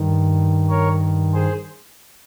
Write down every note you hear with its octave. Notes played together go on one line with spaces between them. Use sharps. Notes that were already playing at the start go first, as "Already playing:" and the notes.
Already playing: G2 D#3
A#4 C#5
G#4 C5